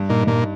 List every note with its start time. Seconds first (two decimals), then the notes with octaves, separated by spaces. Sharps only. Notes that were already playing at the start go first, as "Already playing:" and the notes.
Already playing: G2
0.09 A#2 D#4
0.27 G2 A#2